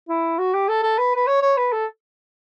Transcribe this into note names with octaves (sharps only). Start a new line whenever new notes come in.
E4
F#4
G4
A4
A4
B4
B4
C#5
C#5
B4
A4